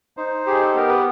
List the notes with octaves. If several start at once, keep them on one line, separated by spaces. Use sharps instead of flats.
D#4 C5
G4 G#4
A4
B3 A#4
B4